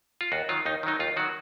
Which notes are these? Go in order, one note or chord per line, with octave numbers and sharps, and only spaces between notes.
F4
D#2 F#4
D#3 F#3 F4
D#2 D#4
D#3 F#3 D#4
D#2 F4
D#3 F#3 F#4